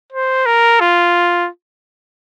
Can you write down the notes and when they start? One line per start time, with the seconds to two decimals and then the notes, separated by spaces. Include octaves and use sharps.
0.13 C5
0.46 A#4
0.80 F4